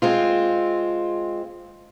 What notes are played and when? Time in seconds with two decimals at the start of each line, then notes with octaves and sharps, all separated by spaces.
0.02 G#3 C4 F4